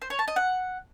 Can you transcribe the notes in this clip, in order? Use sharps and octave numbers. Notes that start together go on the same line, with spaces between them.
C5
C#5
A5
D#5
F#5